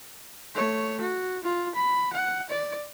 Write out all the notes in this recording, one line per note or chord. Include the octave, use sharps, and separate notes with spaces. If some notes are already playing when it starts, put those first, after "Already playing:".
A3 C#5
F#4
F4
B5
F#5
D5